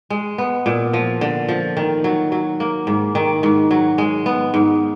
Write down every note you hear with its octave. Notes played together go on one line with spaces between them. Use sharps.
G#3
B3
A#2
F3
D3
F3
D#3
F#3
F#3
A#3
G#2
D#3
G#2
F#3
G#3
B3
G#2